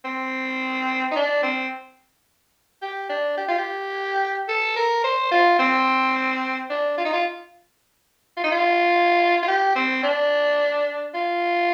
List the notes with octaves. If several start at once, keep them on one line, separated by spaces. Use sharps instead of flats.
C4
D#4
D4
C4
G4
D4
G4
F4
G4
A4
A#4
C5
F4
C4
D4
F4
D#4
F4
F4
D#4
F4
F4
G4
C4
D4
F4